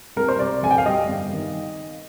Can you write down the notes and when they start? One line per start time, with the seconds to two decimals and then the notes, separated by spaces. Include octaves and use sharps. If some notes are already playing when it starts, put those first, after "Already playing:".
0.16 C2 A#4
0.28 C5
0.38 C3 D5
0.63 F2 G#5
0.71 G5
0.78 F5
0.86 G3 D#5
1.09 G1
1.32 D#3